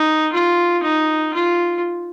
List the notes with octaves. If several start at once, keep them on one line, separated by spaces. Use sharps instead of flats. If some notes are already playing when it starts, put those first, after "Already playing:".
Already playing: D#4
F4
D#4
F4